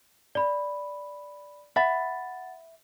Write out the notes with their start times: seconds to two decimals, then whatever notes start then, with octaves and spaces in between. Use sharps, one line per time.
0.35 D5 B5
1.76 E5 F#5 B5 A6